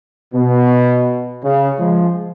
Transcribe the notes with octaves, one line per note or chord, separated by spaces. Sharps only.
B2
C#3
F3 G#3